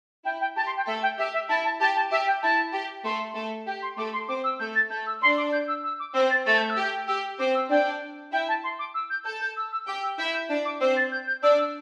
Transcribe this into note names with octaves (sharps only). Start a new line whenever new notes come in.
E4 G5
G5
G4 A5
C6
G5
A3 A4 E5
G5
G4 E5
E5
E4 A5
A5
G4 A5
A5
G4 E5
G5
E4 A5
G4
A3 A4 C6
A3 A4
G4 G5
C6
A3 A4 D6
C6
C4 C5 D6
E6
A3 A4 G6
A6
A3 A4 G6
E6
D4 D5 C6
D6
G6
E6
E6
D6
C4 C5 E6
A6
A3 A4 A6
G6
E6
G4 G6
G4 E6
C4 C5 D6
E6
D4 D5 G5
E4 E5 G5
A5
C6
D6
E6
G6
A4 A5 G6
G6
E6
E6
G4 G5 D6
E6
E4 E5 G6
G6
D4 D5
D6
C4 C5 E6
A6
G6
G6
D4 D5 E6
E6